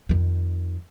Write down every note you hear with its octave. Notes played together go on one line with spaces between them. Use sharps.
F2 D#3